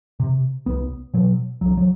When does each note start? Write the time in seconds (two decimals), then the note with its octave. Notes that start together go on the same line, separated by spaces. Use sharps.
0.20 C3
0.66 C2 B3
1.14 B2 F#3
1.61 C2 F#3
1.77 F#3